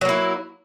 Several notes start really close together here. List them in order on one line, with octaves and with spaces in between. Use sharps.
F#3 A#3 E4